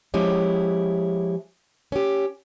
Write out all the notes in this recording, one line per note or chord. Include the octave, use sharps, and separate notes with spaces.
F3 G#3 C#4 E4 G4 C#5
C#4 G4